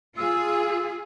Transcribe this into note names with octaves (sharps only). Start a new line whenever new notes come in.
F4 G#4 E6